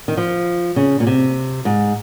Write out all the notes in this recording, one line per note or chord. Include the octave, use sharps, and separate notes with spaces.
D#3
F3
C#3
A#2
C3
G#2